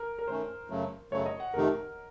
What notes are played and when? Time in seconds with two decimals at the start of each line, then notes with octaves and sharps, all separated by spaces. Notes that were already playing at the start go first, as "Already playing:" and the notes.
Already playing: A#4
0.19 A#4
0.28 D#3 A3 C#4 C5
0.70 F#2 C#3 F#3 A3
1.12 F#2 C#3 F#3 A3 C#5
1.26 D#5
1.40 F#5
1.54 F2 C3 D#3 A3 D#4 A#4